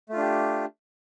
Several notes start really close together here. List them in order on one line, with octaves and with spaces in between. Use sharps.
A3 F4 D4 G4